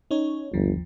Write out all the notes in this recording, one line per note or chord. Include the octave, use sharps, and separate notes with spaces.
C#4 D#4 C#5
G1 D#2 F3